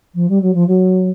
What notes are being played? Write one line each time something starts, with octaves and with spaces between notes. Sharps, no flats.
F3
G3
F#3
F3
F#3